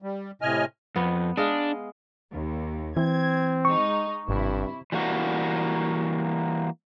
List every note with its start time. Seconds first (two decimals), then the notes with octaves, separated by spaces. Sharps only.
0.02 G3
0.42 A2 C3 D#5 G#5 F6
0.96 F2 B3
1.37 G#3 D4 D#5 F5
2.33 D#2
2.97 E3 C4 G#6
3.65 G#3 D#4 C#6
4.29 G#1 G2 C3 E4
4.92 E3 G3 A#3 F#4